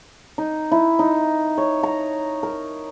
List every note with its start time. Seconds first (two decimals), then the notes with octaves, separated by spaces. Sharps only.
0.38 D#4
0.72 E4
0.99 D#4
1.58 C#5
1.83 A#5
2.43 A#4